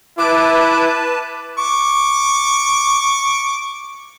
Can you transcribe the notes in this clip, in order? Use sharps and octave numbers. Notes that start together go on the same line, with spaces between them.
E4 B4 A5 D6
C#6 D6